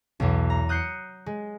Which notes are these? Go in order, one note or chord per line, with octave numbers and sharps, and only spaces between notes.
B1 E2
A#5
D#6 F#6 G6 C7 C#7
G#3